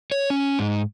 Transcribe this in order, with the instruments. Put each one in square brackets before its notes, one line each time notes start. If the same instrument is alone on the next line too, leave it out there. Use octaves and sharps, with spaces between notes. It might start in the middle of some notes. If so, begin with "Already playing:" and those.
[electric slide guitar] C#5
C#4
G#2